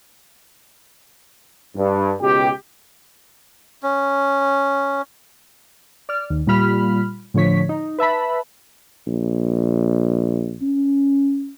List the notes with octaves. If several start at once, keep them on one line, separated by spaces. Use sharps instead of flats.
G2
C#2 B2 G4
C#4
D5 F6
D#2
A#2 G3 F4 B5 F6
A2 D3 F3 C#5 B6
D#4
B4 E5 A5 B5
A#1
C#4